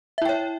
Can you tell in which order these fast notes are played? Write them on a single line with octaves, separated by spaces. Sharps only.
E5 E4 G5 C#5